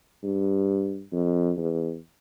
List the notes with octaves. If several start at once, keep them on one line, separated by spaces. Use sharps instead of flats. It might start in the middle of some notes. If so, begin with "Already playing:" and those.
G2
F2
E2